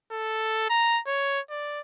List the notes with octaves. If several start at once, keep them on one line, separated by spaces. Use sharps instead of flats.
A4
A#5
C#5
D5